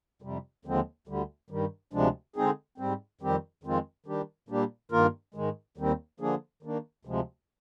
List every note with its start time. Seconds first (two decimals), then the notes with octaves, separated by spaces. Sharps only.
0.22 F2 C3 G3
0.65 D#2 D3 F3 G#3 C4
1.08 D2 D3 G3
1.50 G2 D#3 G3
1.93 D2 C3 F3 G#3 D4
2.36 D3 G#3 C4 D#4 G#4
2.78 G#2 G3 C4
3.21 F2 D#3 G3 C4 G4
3.64 F2 D#3 G#3 C4 F4
4.06 D#3 G3 D4 G4
4.49 A#2 G3 A#3 D4 G4
4.92 G2 D#3 A#3 F4 A#4
5.34 G#2 D#3 G#3
5.77 D#2 D#3 G3 C4
6.20 D3 F3 A#3 D4 G#4
6.63 D#3 A#3 D4
7.05 D2 C3 F3 G#3